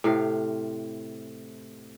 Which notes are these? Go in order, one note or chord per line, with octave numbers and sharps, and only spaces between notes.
A2 C3 F5